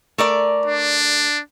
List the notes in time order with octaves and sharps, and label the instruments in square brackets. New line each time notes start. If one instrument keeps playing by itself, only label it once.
[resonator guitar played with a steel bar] A3 A#4 D5
[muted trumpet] D4